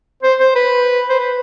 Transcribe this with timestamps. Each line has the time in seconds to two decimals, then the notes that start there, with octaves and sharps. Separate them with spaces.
0.23 C5
0.39 C5
0.55 B4
1.09 C5
1.20 B4